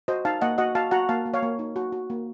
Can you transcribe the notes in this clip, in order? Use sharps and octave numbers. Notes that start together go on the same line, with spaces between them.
F#4 C5 D#5
D#4 F5 A5
A#3 D#5 F#5
F#4 D#5 F#5
F#4 F5 A5
F#4 F#5 A#5
A#3 F5 A5
A#3
C#5 F5
A#3
D#4
F#4
F#4
A#3